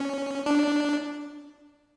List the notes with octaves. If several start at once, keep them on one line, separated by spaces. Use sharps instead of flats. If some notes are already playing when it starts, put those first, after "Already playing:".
Already playing: C#4
D4